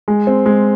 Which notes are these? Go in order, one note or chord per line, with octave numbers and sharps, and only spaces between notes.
G#3
C4
G#3